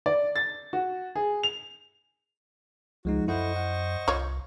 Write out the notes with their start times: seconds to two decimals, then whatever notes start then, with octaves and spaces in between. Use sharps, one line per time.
0.06 D5
0.36 A6
0.73 F#4
1.15 G#4
1.43 F7
3.05 C#2 F3 G#3 D#4 F#4
3.28 F#2 E4 A4 C5 D#5 F#5 C#6
3.56 F#5
4.08 C2 F4 C#5